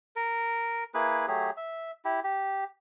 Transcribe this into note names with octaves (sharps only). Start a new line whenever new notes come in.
A#4
A#3 E4 G#4 B4
F#3 A3 G4 G#4
E5
E4 G4
G4